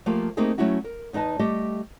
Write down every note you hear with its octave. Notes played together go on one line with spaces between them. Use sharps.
F3 A3 A#3 F4 G4
A3 A#3 C4 D#4 G4 G#4
F#3 A3 C#4 E4 F#4
A#4
E2 D#4 B4 D#5 A5
G3 A3 G4 D#5